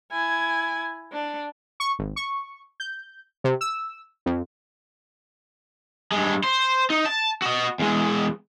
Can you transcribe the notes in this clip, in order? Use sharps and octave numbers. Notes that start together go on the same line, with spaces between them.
E4 G#5
D4
C#6
G#1
C#6
G6
C3
E6
F2
G2 G#3
C5
D#4
A5
F#4 D#5
E2 G#3